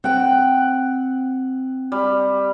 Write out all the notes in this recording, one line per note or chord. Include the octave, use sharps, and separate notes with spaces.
C4 F#5 G5
G3